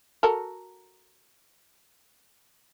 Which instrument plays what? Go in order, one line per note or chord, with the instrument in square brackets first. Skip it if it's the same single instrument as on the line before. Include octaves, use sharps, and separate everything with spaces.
[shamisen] F#4 A4 A#4